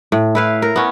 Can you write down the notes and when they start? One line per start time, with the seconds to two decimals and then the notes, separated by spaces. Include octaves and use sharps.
0.12 A2
0.35 E4 B4 F5
0.62 A#4
0.76 B3 C#4